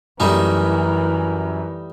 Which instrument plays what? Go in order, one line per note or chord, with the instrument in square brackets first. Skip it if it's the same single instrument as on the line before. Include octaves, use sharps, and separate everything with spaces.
[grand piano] F#2 [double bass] E3 [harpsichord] G3 A3 D#4 [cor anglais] A#4